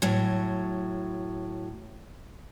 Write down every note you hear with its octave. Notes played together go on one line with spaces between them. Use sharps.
A2 F#3